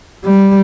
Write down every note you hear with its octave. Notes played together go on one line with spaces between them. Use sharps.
G3